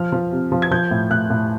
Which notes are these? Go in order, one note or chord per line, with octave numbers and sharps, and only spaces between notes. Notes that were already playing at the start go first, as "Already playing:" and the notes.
Already playing: F3 F6
F3
C3
F3
G#6
F3 G6
A2
A2 F#6
A2